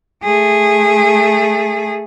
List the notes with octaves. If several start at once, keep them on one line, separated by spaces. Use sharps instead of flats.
A3 G#4